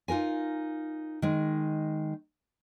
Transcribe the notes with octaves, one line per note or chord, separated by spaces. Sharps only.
D#4 F4 A#4 G#5
D#3 G#3